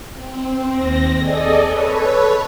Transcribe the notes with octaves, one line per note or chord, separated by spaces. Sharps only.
C4
D#2 C4 A#6
G#4 A4 D5 D#5
A4 B4 C#5